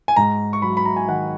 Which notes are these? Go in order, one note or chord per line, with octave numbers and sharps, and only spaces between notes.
G#5
G#2 A#5
C#6
F#3 B5
B5
A#5
G#5
D#3 F#5